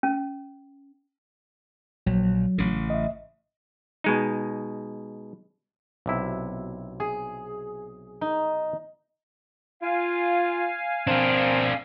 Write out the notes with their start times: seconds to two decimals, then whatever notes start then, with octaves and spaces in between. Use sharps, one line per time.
0.03 C#4
2.06 A#1 F#3
2.58 A1 C#3
2.90 D#5 E5
4.04 B2 G#3 D#4
6.06 B1 C3 E4
7.00 G#4
8.21 D#4
9.82 F4 F5 G#5
11.07 C4 D4 A#4